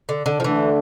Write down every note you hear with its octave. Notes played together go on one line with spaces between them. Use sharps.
D3
D3
F3
D3 E3 A3 D4